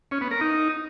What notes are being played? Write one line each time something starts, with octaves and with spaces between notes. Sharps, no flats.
C#4
B3
A#4
D#4